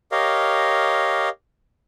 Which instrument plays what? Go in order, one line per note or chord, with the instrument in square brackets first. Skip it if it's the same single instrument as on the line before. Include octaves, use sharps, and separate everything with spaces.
[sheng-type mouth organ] G4 A#4 C#5 D#5 F5